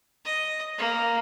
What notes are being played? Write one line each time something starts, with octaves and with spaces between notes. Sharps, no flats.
D#5
A#3